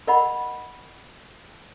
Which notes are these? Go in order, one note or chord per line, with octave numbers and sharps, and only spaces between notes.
A#4 D5 D#5 F#5 B5